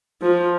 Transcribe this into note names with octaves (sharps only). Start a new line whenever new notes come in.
F3